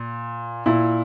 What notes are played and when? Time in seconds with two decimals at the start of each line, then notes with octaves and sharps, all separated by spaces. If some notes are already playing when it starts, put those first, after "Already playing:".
Already playing: A#2
0.66 A#2 E4